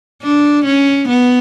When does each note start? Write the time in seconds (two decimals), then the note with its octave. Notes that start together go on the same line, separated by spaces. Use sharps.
0.22 D4
0.65 C#4
1.08 B3